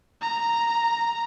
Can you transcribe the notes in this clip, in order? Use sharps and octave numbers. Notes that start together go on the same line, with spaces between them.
A#5